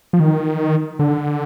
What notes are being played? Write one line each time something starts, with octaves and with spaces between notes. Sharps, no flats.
F3
D#3
D3